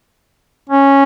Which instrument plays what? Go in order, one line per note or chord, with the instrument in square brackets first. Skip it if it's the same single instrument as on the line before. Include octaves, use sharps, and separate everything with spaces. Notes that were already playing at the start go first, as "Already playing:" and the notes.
[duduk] C#4